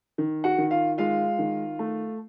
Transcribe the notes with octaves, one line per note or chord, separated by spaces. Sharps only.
D#3
F#4 F#5
D#3
F4 F5
G#3 F4 F5
D#3
A3